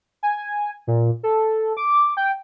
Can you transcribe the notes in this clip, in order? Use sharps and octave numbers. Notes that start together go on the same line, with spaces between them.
G#5
A#2
A4
D6
G5